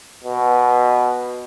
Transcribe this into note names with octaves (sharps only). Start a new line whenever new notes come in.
B2